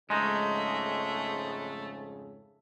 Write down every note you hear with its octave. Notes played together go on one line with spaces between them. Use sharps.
F2 G#2 C#3 G#3 A3 D#4